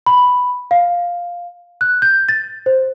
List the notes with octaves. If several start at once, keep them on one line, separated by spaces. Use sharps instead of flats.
B5
F5
F#6
G6
A6
C5